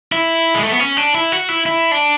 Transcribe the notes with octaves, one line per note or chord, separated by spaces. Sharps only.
E4
G#3
A3
B3
C#4
D4
E4
F#4
E4
E4
D4